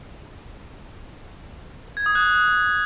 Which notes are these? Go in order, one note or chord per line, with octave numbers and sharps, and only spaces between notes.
G#6
D#6
F#6